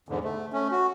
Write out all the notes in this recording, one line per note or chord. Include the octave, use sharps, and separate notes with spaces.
E2 G#2 D3
A3
A3 C#4
F#4